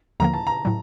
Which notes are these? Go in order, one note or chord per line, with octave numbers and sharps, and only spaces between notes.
D#2 D3 F3 A#3 A#5
A5
A#5
A2 F#3